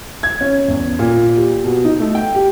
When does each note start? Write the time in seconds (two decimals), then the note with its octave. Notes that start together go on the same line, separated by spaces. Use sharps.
0.23 G#6
0.41 C#4
0.68 E2
0.99 A#2
1.37 G4
1.64 B2
1.85 D#4
2.00 A3
2.15 G5
2.35 G4